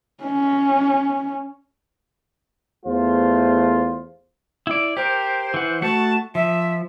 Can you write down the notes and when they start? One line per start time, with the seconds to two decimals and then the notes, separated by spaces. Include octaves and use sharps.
0.24 C#4
2.85 E2 A3 F4 C5
4.67 E4 D5
4.97 G4 A#4 C5
5.54 E3 F#5
5.82 A3 F#4 F#5 A5
6.35 F3 E5